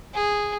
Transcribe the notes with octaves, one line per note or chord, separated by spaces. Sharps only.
G#4